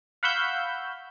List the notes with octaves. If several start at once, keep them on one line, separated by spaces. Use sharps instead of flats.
F5 F#5 B5 C#6 E6 G6